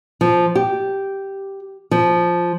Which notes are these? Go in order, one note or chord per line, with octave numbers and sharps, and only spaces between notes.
F3
G4
F3